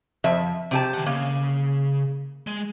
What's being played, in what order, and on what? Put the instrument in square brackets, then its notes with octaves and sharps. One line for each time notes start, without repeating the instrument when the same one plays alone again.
[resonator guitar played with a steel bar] F2 F3 E5
C3 G4 A5
[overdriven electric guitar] D#3 F#5
[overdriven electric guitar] C#3 [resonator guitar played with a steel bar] A#3
[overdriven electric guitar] G#3